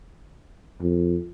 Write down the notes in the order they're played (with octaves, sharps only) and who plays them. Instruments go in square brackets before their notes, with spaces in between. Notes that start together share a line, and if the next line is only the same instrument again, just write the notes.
[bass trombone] F2